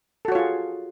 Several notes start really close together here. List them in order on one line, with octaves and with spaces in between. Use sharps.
A4 F#4 C#5 F4 G#4